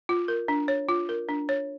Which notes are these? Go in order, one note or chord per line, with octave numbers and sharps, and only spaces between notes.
F4
A#4
D4
C#5
F4
A#4
D4
C#5